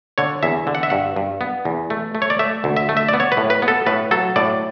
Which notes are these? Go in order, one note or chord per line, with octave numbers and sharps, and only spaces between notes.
D3 C#5
E2 E5
D3
F#5
E5
G2 F#5
G2
B3
E2
A3
A3
C#5
D5
A3 E5
D2
E5
A3
E5
D5
B3
C#5
B4
A2
B4
B3
A4
A2 B4
F#3 A4
A2 D5